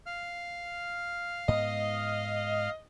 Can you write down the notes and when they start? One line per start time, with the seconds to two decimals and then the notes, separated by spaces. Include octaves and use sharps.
0.06 F5 F6
1.48 G#2 B3 D#5